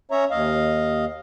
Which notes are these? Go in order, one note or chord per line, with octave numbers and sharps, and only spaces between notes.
C#4 C#5 E5 A#5
D#2 D#5 F5